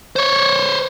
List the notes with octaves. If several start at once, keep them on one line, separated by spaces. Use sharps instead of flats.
C5 C#5